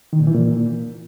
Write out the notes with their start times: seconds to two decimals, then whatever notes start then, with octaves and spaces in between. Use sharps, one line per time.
0.13 D#3
0.20 A#2
0.27 E3
0.34 A#2